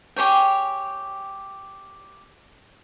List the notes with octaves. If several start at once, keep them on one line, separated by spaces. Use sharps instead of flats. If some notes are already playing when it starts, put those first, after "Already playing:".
G4 G#4 C#5 G5